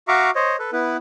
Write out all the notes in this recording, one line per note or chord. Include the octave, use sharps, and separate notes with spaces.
F#4 E5 F5 A#5 C#6 D6
C5 C#5 D#5
A4 B4
B3 E4 B4